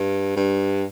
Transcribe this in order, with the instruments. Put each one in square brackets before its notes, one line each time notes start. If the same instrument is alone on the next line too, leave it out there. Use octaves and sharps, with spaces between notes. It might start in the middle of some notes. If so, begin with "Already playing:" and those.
Already playing: [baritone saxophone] G2
G2